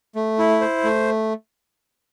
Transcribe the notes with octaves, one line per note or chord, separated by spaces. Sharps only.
A3
E4
C5
A3